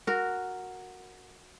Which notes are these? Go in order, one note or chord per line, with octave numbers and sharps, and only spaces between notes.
F#4 A#4